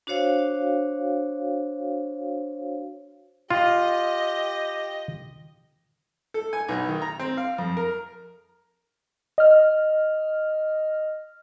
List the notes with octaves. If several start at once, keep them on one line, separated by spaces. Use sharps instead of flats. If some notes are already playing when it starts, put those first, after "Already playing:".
D4 F#4 C5 C#5 F5
F4 G4 D#5
A4
G#5
B1
D#3
A#5
C4
F5
F2
A#4
D#5 F6